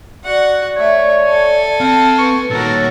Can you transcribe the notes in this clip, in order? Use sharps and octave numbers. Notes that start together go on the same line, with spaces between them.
F#4 D5 F#5
A3 C#5 E5
A4 G#5
C4 F5 A5
B4 C#6
A#2 D#3 F#4 A4 A#4 C#5